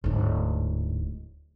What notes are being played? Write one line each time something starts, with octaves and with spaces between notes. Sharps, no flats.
D1 G#2